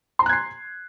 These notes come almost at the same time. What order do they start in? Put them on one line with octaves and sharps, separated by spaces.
C6 A#5 F#6 G#6 C7